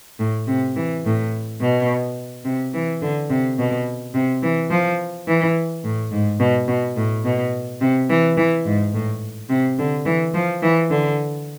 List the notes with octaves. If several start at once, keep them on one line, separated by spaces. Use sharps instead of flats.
A2
C3
E3
A2
B2
C3
E3
D3
C3
B2
C3
E3
F3
E3
A2
G#2
B2
B2
A2
B2
C3
E3
E3
G#2
A2
C3
D3
E3
F3
E3
D3